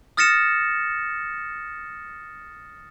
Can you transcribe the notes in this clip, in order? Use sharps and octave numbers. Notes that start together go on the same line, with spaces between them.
D#6 F6 A6 A#6 C#7 E7